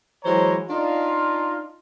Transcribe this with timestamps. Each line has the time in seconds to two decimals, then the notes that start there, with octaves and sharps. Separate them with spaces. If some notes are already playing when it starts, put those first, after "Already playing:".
0.24 E3 F#3 G#3 C5 C#5 A#5
0.70 D4 D#4 F4